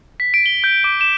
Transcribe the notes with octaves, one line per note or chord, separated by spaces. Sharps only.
B6
D7
G7
G6
D6
E7